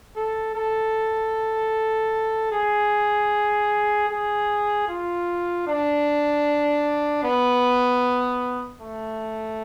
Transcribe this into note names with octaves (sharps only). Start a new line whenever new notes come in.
A4
A4
G#4
G#4
F4
D4
B3
A3